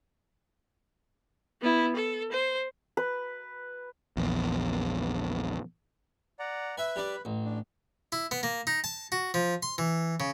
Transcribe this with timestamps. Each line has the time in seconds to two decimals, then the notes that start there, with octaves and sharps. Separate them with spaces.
1.61 B3 E4
1.96 A4
2.32 C5
2.97 B4
4.17 A#1 E2
6.39 D5 F#5 A#5
6.78 B4 E5 G#5 B5
6.96 G3 D4
7.25 A1
7.44 D4
8.12 E4
8.31 B3
8.43 A#3
8.67 D#4
8.84 A5
9.12 F#4
9.34 F3
9.63 C6
9.78 E3
10.20 C#3